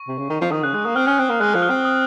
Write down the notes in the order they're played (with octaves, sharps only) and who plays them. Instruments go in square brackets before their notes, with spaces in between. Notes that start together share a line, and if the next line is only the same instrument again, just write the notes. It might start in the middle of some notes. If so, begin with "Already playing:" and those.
Already playing: [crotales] C#6
[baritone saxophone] C3
C#3
D#3
F3
[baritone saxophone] D#3 [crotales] D#6
[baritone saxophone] C#3 [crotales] F#6
[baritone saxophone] G#3 [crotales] F#6
[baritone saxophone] A#3 [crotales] D#6
[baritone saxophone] C4 [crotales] F6
[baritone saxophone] C#4 [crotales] F6
[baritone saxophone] C4 [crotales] F#6
[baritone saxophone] A#3
[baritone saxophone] G#3 [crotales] F#6
[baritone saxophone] F3 [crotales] F#6
[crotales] F6
[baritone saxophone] C4
[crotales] D#6